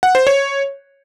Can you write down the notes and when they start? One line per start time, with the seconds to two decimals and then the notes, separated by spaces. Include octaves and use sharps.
0.03 F#5
0.15 C5
0.27 C#5